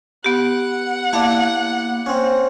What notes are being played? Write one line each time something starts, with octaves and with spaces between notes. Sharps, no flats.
B3 G4 F#5
A#3 E4 D5 F5 A5
C4 C#4